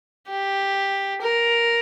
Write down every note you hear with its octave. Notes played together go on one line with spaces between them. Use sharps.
G4
A#4